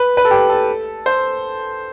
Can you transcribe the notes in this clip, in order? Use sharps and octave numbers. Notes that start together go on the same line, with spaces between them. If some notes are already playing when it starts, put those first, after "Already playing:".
Already playing: B4
B4
A4
G4
A4
C5